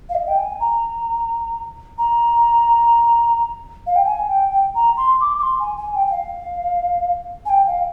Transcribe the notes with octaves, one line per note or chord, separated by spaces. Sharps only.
F5
D#5
G5
G#5
A#5
A#5
F5
G5
G#5
G5
G5
A#5
C6
D6
D6
C6
G#5
G#5
G5
G5
F5
G#5
G5
F5